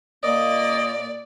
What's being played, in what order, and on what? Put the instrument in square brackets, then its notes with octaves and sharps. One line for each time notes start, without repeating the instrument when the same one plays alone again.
[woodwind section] A#2 A#3 [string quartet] D5 [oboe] D#5